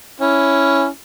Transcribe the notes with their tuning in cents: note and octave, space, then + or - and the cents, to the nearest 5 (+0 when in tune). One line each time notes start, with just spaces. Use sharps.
C#4 +0 E4 +0